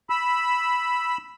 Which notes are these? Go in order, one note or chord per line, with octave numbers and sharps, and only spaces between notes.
B5 E6